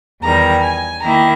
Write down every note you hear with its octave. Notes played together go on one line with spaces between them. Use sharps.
E2 D#3 G3 A#5
G#5
D#3 A#3 E4 A#5